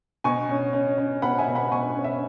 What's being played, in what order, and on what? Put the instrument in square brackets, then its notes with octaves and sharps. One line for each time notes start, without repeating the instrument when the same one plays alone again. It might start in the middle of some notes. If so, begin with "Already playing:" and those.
[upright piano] B2 G#5 C#6
C#4
C#4
C#4
B2 F#5 B5
E5 G#5
B2
F#5 B5
B2 G#5 C#6
C#4
E5